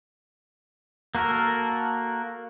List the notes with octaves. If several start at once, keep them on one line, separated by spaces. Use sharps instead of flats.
A#3 F#4 A4 A#4